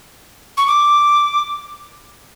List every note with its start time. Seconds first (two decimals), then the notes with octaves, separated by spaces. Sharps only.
0.57 C#6
0.67 D6